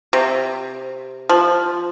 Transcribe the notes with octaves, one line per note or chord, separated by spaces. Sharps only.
C3
F3